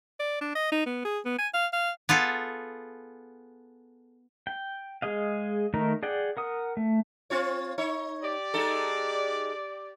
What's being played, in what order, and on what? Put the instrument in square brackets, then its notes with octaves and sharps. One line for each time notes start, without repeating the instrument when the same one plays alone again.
[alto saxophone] D5
D4
D#5
D#4
B3
G#4
B3
G#5
F5
F5
[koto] B3 F4 G#4 A4
[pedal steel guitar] G5
G#3 G#4 D#5 F5
D#3 A3 D#4 A#4
G#4 D5 F#5 G5
A#4 F#5 D#6
A3
[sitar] C4 F4 C#5
D#4 C#5
[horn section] G4 D5
[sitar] G#3 D#4 A4